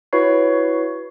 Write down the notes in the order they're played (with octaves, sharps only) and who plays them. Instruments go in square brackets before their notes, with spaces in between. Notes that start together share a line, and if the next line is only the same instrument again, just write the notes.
[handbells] E4 F#4 B4 C#5 C#6 C7